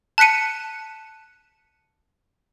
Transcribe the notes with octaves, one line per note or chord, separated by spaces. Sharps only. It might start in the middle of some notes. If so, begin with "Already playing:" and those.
A5 F#6 B6 C#7 D#7